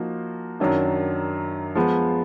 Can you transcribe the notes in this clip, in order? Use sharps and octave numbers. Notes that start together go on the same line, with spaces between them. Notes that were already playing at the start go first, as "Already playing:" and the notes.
Already playing: F3 A#3 D#4 F#4
F#2 D#3 F#3 D4
F3 G#3 B3